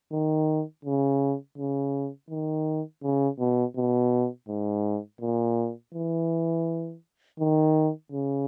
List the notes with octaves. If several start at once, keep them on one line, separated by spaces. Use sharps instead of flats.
D#3
C#3
C#3
D#3
C#3
B2
B2
G#2
A#2
E3
D#3
C#3